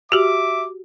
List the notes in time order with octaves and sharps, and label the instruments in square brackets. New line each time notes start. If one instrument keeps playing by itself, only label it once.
[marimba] F#4 G4 [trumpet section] E5 D6